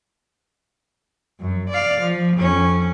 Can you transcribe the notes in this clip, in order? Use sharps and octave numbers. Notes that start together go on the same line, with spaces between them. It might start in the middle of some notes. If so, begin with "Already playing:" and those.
F#2
D5 F5
F3
F2 C#4